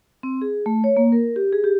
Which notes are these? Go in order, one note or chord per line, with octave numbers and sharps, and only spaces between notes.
C4
G#4
A3
C#5
A#3
A#4
G4
G#4
G4